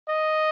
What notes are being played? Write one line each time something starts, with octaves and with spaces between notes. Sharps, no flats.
D#5